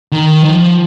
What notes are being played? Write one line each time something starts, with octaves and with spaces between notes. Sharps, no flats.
D#3
F3